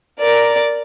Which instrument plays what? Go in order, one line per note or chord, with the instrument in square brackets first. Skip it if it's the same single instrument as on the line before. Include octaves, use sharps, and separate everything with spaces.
[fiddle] A#4 D5